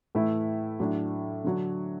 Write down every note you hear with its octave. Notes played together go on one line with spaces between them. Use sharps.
A2 E3 A3 E4
A2 F#3 D4
D3 F#3 D4